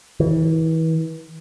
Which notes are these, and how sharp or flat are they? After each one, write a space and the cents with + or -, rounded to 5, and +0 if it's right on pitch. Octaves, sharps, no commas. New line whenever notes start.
E3 -35